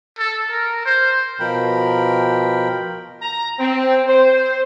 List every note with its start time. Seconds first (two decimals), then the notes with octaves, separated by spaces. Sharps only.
0.18 A4
0.50 A#4
0.86 C5
1.40 B2 F3 A#4 G5 B5
3.21 A#5
3.58 C4
4.06 C5